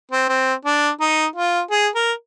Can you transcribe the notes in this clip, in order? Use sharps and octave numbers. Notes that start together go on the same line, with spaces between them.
C4
C4
D4
D#4
F4
G#4
A#4